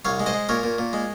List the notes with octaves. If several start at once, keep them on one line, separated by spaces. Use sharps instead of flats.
C2 C#5 F5
G#3
C5 D#5
G#3
A#2 A#4 C#5
A#2
A#2
G#3